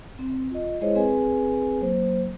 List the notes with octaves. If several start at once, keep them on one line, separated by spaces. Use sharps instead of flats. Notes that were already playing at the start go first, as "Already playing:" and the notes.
C4
F4 D#5
G#3 E4 G#4 C5 C#5 D#5
C4 G#4 B4 G#5
F#3 A#3 C5